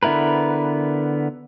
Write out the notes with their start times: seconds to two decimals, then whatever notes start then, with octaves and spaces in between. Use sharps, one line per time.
0.03 D3 B3 E4 A#4 B4